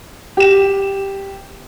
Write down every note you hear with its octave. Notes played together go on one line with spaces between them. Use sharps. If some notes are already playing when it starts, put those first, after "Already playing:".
G4 E7